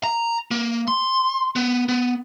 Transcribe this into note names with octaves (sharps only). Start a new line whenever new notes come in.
A#5
A#3
C6
B3
B3